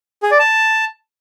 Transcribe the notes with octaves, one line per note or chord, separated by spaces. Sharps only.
G#4
D5
A5